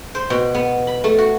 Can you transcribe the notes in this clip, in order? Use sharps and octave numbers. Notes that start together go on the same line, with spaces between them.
C5
B2
B3
B5
A3
F#4